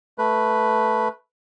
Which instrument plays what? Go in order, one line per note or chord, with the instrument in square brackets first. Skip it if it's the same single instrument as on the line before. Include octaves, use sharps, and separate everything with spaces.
[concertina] A3 B4